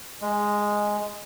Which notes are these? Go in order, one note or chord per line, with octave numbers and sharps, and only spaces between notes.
G#3